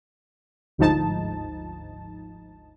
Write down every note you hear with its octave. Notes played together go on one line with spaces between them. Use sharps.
G1 D2 G#2 F3 D#4 A5